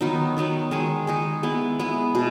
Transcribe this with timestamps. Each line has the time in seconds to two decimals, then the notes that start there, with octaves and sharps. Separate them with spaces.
0.01 D#3 F#3 B3 D#4
0.37 D#3 F#3 B3 D#4
0.71 D#3 G#3 D#4 G#4
1.07 D#3 G#3 D#4 G#4
1.43 G#3 B3 E4
1.79 G#3 B3 E4
2.15 B2